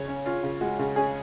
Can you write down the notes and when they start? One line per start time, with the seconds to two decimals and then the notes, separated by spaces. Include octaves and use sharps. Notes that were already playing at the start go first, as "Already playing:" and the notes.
Already playing: C#3 C#5
0.08 C#4
0.26 C#4 F4
0.43 C#3
0.61 G#3 F#4
0.79 C#3
0.96 C#4 G#4